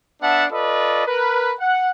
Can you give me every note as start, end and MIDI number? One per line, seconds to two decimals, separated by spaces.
0.22 0.45 59
0.22 0.45 62
0.22 0.45 76
0.22 0.45 78
0.22 0.45 81
0.51 1.04 65
0.51 1.04 69
0.51 1.04 71
0.51 1.04 74
0.51 1.04 75
1.06 1.54 70
1.06 1.54 71
1.60 1.91 78